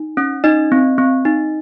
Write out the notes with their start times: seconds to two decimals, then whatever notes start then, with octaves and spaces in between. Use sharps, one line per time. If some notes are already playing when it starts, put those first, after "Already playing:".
Already playing: D#4
0.17 C#4
0.44 D#4 D#5
0.72 C4
0.98 C4
1.25 D#4